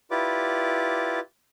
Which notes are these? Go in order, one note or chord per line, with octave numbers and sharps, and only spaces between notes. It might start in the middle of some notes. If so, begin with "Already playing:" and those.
E4 F4 G4 B4 D5 D6